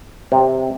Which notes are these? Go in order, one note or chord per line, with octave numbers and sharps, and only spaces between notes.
C3